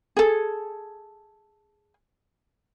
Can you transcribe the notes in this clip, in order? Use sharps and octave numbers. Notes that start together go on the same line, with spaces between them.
G#4 A4